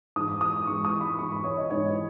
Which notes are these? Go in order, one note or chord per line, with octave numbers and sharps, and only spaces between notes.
G#2 E3 G#3 D#6
D#6
G#2 E3 G#3 C#6
D#6
B5
G#2 E3 G#3 C#6
B5
C#5
D#5
G#2 E3 G#3 C#5